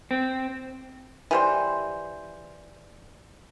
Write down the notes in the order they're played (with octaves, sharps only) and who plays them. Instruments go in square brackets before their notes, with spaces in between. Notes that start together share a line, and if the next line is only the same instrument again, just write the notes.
[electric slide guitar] C4
[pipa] E3 G3 C5